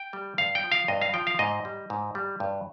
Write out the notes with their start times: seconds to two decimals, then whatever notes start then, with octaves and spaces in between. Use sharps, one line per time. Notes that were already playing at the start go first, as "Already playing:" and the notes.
Already playing: G5
0.13 G3
0.38 G2 F5
0.55 G5
0.63 F3
0.72 F5
0.88 G2 D#5
1.01 F5
1.14 F3 G5
1.27 F5
1.39 G#2 D#5
1.65 G3
1.90 G#2
2.15 G3
2.40 G2